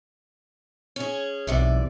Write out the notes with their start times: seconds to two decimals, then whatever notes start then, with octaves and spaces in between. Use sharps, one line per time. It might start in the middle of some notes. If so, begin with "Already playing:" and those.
0.96 C#4 G#4
1.47 B1 C3 E3 D5